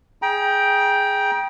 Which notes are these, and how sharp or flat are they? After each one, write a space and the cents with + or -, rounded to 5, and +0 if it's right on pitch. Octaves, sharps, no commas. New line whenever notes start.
G#4 +0 G5 +0 A#5 +40